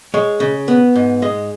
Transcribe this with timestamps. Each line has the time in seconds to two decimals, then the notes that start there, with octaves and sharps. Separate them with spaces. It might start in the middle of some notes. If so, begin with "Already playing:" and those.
0.14 G#3 C#5
0.40 C#3
0.68 B3
0.96 G#2
1.22 G#3 D#5